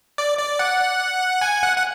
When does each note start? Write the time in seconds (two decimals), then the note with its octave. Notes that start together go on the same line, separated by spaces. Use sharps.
0.18 D5
0.38 D5
0.59 F#5
1.41 G#5
1.63 F#5
1.77 F#5